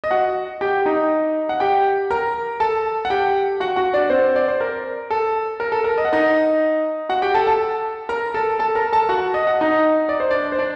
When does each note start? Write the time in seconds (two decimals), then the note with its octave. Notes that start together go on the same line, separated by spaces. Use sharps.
0.04 D#5
0.11 F#4 F#5
0.61 G4 G5
0.86 D#4 D#5
1.49 F#5
1.60 G4 G5
2.11 A#4 A#5
2.60 A4 A5
3.05 F#5
3.10 G4 G5
3.60 F#4 F#5
3.76 F#4 F#5
3.93 D4 D5
4.10 C4 C5
4.36 D5
4.48 C5
4.61 A#4
5.10 A4
5.60 A#4
5.72 A4
5.84 A#4
5.98 D#5
6.05 F#5
6.13 D#4 D#5
7.09 F#4 F#5
7.22 G4 G5
7.34 A4 A5
7.47 A4 A5
8.09 A#4 A#5
8.34 A4 A5
8.59 A4 A5
8.75 A#4 A#5
8.92 A4 A5
9.09 F#4 F#5
9.34 D#5
9.47 F#5
9.61 D#4 D#5
10.09 D5
10.20 C5
10.31 D4 D5
10.52 C5
10.58 D4 D5